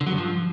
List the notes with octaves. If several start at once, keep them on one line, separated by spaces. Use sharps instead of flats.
D3
F#3
G2
F3